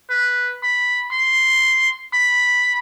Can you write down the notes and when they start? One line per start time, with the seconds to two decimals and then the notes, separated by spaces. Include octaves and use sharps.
0.10 B4
0.63 B5
1.12 C6
2.14 B5